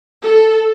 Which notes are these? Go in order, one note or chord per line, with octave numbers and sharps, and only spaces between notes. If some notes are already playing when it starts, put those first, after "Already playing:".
A4